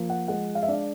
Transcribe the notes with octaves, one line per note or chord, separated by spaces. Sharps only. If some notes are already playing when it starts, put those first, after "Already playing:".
Already playing: F3 A#3
F#5
G#3 F#5
F5
E5
D4 F5